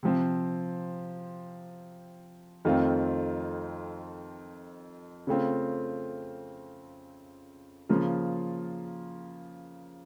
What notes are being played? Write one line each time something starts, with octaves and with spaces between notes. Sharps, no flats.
C3 F3 C4
F2 D#3 A3 C4 F4
C#3 A3 C4 F4
C#3 F3 A#3 F4